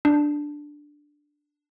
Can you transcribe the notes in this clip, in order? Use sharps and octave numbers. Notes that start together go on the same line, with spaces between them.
D4